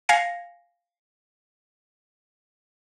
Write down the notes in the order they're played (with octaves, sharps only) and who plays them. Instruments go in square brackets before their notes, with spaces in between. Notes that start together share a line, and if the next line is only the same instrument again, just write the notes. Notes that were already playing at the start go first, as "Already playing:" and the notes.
[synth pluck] F5 G#5 G#6 A#6 C7 C#7